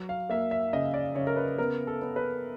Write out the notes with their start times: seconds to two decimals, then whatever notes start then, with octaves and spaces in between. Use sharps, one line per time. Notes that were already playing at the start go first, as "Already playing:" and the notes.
Already playing: F#3
0.09 F5
0.30 A#3 E5
0.51 E5
0.73 C#3 D#5
0.94 D5
1.15 C#3 C#5
1.27 A#4
1.36 B4
1.58 B3 A#4
1.87 A4
2.02 B3
2.16 B4